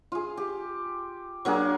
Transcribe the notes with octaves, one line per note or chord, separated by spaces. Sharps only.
F4 G#4
G4
F#3 A#3 D4 G#4